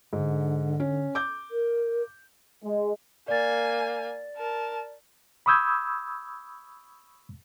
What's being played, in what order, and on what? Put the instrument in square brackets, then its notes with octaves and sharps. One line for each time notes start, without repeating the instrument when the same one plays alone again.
[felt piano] G#2 [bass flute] D3
[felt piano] C#4
D6 G6
[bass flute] A#4
[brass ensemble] G#3
[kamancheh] A#3 G#5 [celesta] D5 A6
[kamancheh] A#4 A5
[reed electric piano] B5 C#6 D#6 E6 G6 G#6